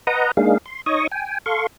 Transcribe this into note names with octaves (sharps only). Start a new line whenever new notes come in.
B4 D#5 F#5 A#5 D#6
G#3 A#3 D4 D#4 G#4 F5
C6
D#4 C#5 D#5 C#6 D#6
G5 G#5
A4 F5 C6 C#6